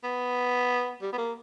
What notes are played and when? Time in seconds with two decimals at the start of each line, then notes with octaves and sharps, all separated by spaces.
0.04 B3
1.02 G3
1.13 B3
1.18 A#3